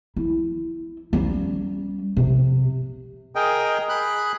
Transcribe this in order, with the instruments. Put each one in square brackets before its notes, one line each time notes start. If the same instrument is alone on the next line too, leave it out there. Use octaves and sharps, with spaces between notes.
[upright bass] E4
G3 C#4
C3
[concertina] G#4 A#4 D#5 G5
G#4 B5 F#6